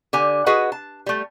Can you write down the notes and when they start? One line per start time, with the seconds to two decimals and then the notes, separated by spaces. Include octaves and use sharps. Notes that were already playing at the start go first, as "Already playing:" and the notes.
0.13 D3 G4 G#5
0.46 F#4 G#4 B4 D#5 F#5
0.72 A5
1.06 G3 A3